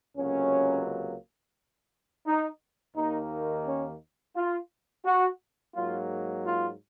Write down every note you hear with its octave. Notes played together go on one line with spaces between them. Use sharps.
C#2 C3 F#3 A#3 C#4
D#4
D#2 D#3 A#3 D#4
C#4
F4
F#4
G#2 F#3 A#3 F4
F4